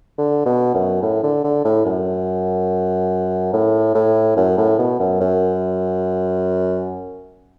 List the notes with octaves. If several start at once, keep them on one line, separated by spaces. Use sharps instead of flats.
D3
B2
F#2
A2
D3
D3
A2
F#2
A2
A2
F#2
A2
B2
F#2
F#2